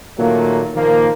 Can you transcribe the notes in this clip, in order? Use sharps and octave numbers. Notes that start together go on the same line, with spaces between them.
A#2 D#3 F#3 A3 A#3
A#2 D#3 F3 A#3